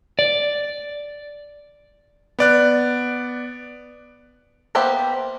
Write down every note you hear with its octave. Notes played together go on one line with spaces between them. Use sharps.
D5
B3 D5 F#6
A#3 B3 G4 C5 E5